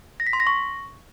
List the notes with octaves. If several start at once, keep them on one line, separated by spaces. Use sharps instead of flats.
A#6
B6
C6
A#6
C#6